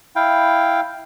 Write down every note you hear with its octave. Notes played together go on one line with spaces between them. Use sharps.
E4 F5 G5